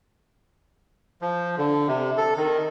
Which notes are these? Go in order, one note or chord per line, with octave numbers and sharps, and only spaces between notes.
F3
D3
C3
A4
D#3